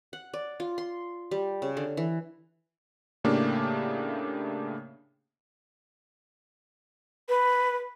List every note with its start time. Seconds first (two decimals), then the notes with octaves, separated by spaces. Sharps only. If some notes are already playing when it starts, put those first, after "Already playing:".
0.13 F#5
0.34 D5
0.60 F4
0.78 C6
1.31 G3
1.62 C#3
1.77 D3
1.97 E3
3.24 A2 C#3 A3 A#3 D4 G4
7.29 B4